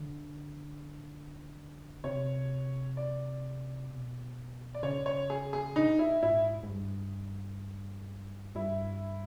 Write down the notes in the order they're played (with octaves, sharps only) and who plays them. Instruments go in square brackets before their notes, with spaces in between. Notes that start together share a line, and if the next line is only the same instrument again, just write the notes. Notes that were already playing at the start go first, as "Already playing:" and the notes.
Already playing: [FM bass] D3
[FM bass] C3 [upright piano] C#5
[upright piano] D5
[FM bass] B2
[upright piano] D5
[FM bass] C#3 [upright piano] C#5
[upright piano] C#5
G#4
G#4
[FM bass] A#2 [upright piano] D#4
[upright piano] E4
[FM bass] G#2 [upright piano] E4
[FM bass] G#2
G2
[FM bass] G2 [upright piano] E4